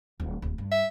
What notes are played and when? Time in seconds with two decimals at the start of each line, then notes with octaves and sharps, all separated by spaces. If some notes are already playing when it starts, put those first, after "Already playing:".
0.20 D1
0.42 D1
0.58 G2
0.71 E5